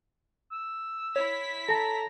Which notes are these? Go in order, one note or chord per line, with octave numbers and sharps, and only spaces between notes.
E6
E4 C#5 B6
A4 A5 A#5